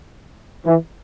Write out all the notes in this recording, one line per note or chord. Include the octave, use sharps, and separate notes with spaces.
E3